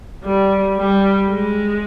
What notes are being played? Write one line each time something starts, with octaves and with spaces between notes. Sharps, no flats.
G3
G3
G#3